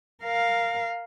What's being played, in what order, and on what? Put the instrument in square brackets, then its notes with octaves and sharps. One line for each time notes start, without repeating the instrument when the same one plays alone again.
[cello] A#4 F5